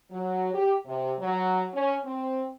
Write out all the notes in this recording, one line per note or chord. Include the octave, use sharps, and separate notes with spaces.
F#3
G4
C3
F#3
C#4
C4